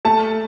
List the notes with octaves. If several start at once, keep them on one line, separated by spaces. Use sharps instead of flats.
A3 A5